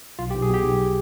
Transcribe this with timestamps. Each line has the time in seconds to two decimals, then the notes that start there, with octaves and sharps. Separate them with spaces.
0.19 B1 F4
0.31 G4
0.34 B1
0.42 G#4
0.50 B2 G4
0.65 B1